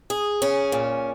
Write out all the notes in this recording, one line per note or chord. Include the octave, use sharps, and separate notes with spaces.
G#4
C#4
A#2